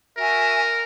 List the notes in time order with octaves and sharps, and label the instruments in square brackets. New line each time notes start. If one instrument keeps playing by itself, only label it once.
[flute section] F#4 E5 G#5 [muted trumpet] A#4